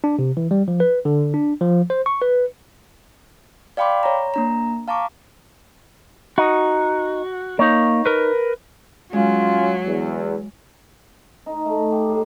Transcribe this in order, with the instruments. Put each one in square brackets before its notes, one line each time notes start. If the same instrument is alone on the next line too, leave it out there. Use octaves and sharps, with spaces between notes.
[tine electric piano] D4
C3
E3
G3
F3
B4
D3
D4
F3
C5
C#6
B4
[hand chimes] D5 F5 G5 B5 C6 D6
C#5 A#5
A#3 D4 A#5
F5 A5 A#5 C#6 D6
[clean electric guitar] D#4 [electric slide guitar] F#4
[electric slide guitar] A#3 [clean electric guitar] D#4 C#5
[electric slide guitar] A#4 B4
[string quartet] F#3 [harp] G#3 [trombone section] C#4 F4
[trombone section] E2
[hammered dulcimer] D#4
A3
G4
A2